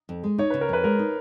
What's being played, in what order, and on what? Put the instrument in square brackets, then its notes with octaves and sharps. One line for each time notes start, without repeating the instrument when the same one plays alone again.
[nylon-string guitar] F2
G#3
[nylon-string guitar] D#4 [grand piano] C#5
[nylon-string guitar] C#3 [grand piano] B4
[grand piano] A#4
[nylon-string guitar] F2 [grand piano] B4
[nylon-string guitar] G#3 [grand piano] A#4
[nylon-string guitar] D#4